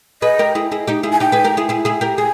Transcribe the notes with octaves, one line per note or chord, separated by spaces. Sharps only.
G#4 B4 D#5
G4 A#4
E4 G#4
E4 G#4
D#4 G4
E4 G#4
G#5
D#4 G4 G5
G#4 B4
G4 A#4
E4 G#4
E4 G#4
E4 G#4
G4 A#4
G#4 G#5